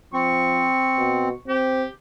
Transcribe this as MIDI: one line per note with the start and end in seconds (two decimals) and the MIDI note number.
0.14 0.67 53
0.14 1.29 60
0.14 1.42 85
0.99 1.32 47
1.48 1.85 60
1.48 1.89 67